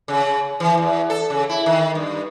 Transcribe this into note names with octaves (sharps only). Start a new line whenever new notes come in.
C#3
E3
E2
A4
C#3
E4
D#3
G2